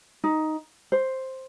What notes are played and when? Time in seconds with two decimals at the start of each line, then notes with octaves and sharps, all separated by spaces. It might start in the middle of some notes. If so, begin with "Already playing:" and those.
0.24 D#4
0.92 C5